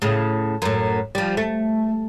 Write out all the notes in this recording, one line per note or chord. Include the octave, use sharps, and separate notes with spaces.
A2 C#3
F#2 A2
F3 G3
A3